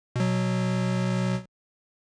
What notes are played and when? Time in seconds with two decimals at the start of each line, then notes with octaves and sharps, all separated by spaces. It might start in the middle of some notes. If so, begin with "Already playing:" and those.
0.16 B2 F#3